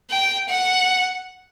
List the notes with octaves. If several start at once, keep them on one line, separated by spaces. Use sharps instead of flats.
G5
F#5